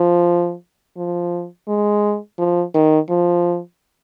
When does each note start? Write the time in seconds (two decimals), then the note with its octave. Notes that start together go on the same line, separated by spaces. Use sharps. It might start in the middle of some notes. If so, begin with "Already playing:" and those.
Already playing: F3
0.97 F3
1.68 G#3
2.38 F3
2.74 D#3
3.09 F3